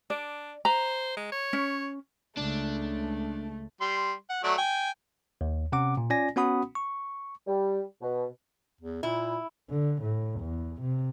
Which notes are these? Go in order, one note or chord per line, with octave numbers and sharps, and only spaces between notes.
D4 D5
C5 A#5
G#3
C#5
C#4
C#2 A3 D4
G3 C6
F#5
F#3 A3 D5
G5 G#5
D#2
C3 C#4 F#5 D6
A#2
C#4 F4 D5 G#5 A#6
B3 C#4 F#4 F#5 B5 D#6
C#6
G3
B2
E2
A#2 E4
D3
A2
E2
C3